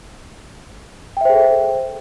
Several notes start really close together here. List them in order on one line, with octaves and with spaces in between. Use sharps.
G5 E5 C5 G#4 A4